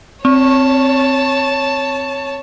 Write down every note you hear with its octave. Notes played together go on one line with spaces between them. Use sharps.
C4 C#5 A5